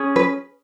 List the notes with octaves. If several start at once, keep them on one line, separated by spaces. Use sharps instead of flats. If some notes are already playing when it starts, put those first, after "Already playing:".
Already playing: C#4 G#4
B4